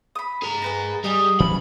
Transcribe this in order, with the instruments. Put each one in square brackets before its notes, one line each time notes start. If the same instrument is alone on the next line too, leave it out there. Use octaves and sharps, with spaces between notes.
[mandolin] B5 D#6
[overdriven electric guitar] G#4 A#5
[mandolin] A#4 B4 G#5
[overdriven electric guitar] G3 [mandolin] G#4 D#5
[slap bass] E3 F#3 C#4 [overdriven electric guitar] B5